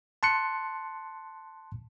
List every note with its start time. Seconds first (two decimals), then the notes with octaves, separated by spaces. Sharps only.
0.23 A5 C6 F#6 C#7